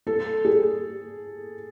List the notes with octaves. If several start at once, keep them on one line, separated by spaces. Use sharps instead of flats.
A4
G#4